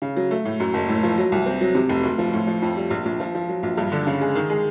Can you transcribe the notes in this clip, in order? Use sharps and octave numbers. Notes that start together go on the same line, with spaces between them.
C#3
F#3
A3
A2
F#2
F#1
A2
F3
F#3
C2
C4
F#3
C3
F1
D2
F3
A2
F3
F2
G3
A#1
A#1
F3
F3
F#3
A#1
G2
D3
C#3
G#3
D#3
G#3